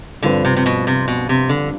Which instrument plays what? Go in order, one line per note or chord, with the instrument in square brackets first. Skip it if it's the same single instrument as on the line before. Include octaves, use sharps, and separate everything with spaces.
[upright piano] G2 F3 C4 F4 B4 [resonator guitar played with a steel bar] D3
[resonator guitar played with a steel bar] C3
C3
B2
C3
B2
C3
D3